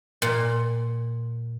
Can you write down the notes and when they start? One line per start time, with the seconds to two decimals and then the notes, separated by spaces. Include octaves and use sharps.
0.22 A#2